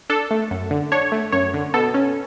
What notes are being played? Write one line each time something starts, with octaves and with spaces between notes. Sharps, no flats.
D4 A4
A3
F#2
D3
D4 C#5
A3
F#2 C#5
D3
B2 A4
C#4